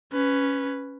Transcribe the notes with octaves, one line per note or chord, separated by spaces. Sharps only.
C#4 B4